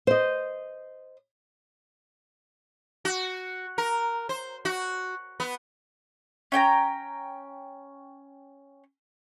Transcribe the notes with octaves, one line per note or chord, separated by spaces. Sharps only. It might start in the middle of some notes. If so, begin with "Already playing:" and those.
C5 D#5
F#4
A#4
C5
F#4
B3
C#4 G5 G#5 A#5